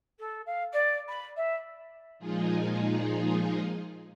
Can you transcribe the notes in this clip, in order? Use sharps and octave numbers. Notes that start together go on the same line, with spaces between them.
A4
F5
D5
B5
E5
A#2 F3 G#3 D#4 F4 G#4